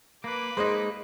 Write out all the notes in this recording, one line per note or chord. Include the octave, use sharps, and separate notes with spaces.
A#3 B4 D6
G#3 A#3 D#4 G#4 C5 D#5